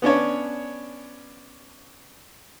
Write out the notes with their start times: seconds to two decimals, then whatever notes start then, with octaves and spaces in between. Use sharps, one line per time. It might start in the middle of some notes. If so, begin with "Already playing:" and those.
0.02 B3 C#4 D4 C#5